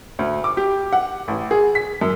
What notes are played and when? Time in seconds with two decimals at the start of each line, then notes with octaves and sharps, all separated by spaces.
0.19 D2
0.44 D6
0.57 G4
0.93 F#5
1.28 A1
1.51 G#4
1.75 B6
2.01 F#2